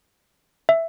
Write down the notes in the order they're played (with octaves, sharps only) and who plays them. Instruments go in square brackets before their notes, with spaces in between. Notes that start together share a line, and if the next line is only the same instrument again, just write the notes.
[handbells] E5